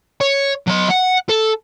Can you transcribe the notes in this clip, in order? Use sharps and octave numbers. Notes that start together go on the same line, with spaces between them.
C#5
F#3 D#5
F#5
A4